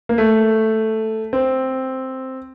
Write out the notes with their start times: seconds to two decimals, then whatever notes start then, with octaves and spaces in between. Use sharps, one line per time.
0.09 A#3
0.18 A3
1.33 C4